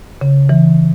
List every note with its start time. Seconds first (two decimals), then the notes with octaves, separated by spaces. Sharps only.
0.21 C#3
0.49 E3